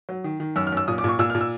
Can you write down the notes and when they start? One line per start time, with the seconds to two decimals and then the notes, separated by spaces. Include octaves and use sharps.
0.09 F#3
0.24 D#3
0.40 D#3
0.56 F#2 E6
0.67 F6
0.72 F#2 E6
0.88 A#2 D#6
0.98 D6
1.04 A#2 C#6
1.19 A#2 E6
1.30 F6
1.35 A#2
1.41 E6